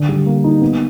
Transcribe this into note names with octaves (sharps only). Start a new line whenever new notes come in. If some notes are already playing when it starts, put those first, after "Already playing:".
Already playing: D3
G3
A#3
D#4
B3